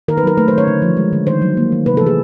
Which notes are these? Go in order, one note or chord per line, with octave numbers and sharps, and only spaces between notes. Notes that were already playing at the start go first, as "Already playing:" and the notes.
D#3 A#4
B4
F#3 A#4
A3 B4
C5
D#3 C#5
D3
F3
G#3
D3
D#3 C5
F#3
A#3
D#3
C3 B4
E3 A4
G#4